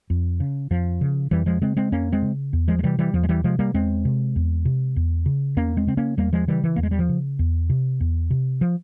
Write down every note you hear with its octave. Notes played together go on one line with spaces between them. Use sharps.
F2
C#3
F2 F3
C#3
F2 E3 G3
F3 G#3
C#3 G#3 C4
G#3 C4
F2 A#3 C#4
G#3 C4
C#3
E2
F3 G#3
G#3
C3 E3 G3
E3 G3
E2 F3
G#3
E3 G3
C3 F3 G#3
G3 A#3
E2 G#3 C4
C3
E2
C3
E2
C#3
E2 A#3 C#4
G#3 C4
C#3 C4
A#3 C#4
E2 G3 A#3
F3 G#3
C#3 E3 G3
E3
E2 A#3
G#3
G3
F3
C#3
E2
C3
E2
C3
F3